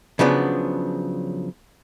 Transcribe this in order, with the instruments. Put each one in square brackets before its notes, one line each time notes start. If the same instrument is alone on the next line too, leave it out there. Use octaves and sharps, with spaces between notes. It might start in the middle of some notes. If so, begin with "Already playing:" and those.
[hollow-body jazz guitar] C#3 F3 F#3 B3 D4